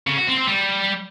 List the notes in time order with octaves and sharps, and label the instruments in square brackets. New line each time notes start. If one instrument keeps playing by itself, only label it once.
[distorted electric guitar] C#3
F#4
C4
C4
G3